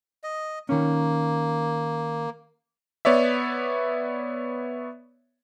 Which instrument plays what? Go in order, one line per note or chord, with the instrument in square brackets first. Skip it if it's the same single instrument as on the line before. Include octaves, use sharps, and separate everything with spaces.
[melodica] D#5
[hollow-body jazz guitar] D#3 C#4 [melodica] A#3
[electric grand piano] B3 C#5 D5 E5